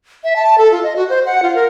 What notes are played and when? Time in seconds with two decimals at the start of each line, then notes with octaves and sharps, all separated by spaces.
0.24 E5
0.36 A5
0.58 A4
0.72 F4
0.83 D#5
0.96 F#4
1.10 C5
1.26 F#5
1.43 F4
1.55 A#4